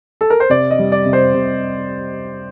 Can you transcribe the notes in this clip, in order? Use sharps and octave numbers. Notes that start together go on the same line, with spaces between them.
A4
A#4
C5
C3 D5
D#5
G3
D5
C3
C5
C3